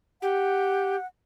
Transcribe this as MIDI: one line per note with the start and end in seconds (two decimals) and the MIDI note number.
0.22 0.96 67
0.22 1.06 78